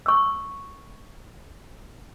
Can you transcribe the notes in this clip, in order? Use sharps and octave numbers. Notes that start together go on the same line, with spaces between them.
C#6 E6